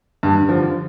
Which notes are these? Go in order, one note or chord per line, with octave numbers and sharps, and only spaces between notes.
G2
D3 F3